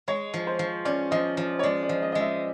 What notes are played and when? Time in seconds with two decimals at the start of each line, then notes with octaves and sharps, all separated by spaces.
0.08 G#3 C#5
0.34 F3
0.47 C5
0.59 F3
0.85 C#4 D5
1.11 F3 D#5
1.37 F3
1.59 C#5
1.63 G#3 D5
1.83 D5
1.89 F3
2.02 D#5
2.12 G#3 D#5
2.21 E5